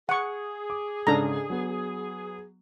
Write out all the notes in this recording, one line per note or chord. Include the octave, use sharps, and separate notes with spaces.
G#4 F#5 C#6
D6
G#2 C#3 D4 A4 A#5
F#3 B3